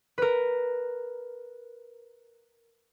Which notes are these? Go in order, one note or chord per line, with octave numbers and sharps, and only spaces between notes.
A#4 B4